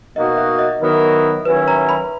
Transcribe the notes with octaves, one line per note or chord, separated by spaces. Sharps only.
B2 A#3 D#4 F#4 D#5
E5
D#5
D#3 F#3 B3 E4 A#4
D#3 F#3 C#4 E4 B4
A#5
B5